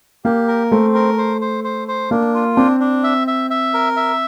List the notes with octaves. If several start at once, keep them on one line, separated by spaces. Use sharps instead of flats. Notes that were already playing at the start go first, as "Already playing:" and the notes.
A#3 G4
A#4
A3 C4
A#4
C5
C5
C5
C5
A#3 D4
F4
C4 D4
D4
E5
E5
E5
A#4
E5